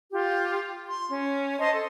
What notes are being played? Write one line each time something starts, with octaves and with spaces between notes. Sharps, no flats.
F4 G4
C6
C#4
C5 D#5 A5 C6
A4